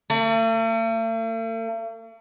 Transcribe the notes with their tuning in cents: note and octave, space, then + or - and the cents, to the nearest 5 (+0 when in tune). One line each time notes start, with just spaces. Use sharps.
A3 +45